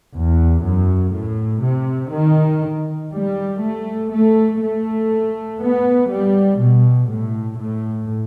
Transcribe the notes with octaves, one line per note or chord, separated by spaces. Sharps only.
E2
F#2
A2
C3
D#3
G3
A3
A3
A3
B3
G3
B2
A2
A2